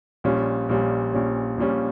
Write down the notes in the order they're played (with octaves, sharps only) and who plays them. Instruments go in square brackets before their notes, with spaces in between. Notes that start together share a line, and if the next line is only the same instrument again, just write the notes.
[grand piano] A#1 A#2 G3 C#4
A#1 A#2 G3 C#4
A#1 A#2 G3 C#4
A#1 A#2 G3 C#4